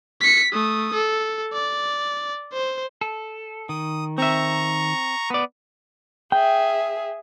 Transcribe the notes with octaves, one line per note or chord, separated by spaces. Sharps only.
B6 C#7
A3 D#6
A4
D5
C5
A4
D#3 D#6
C4 E5 A#5 C#6
B3 D5
G#4 E5 G5